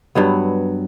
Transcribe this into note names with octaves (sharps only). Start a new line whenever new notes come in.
G2 F#3 B3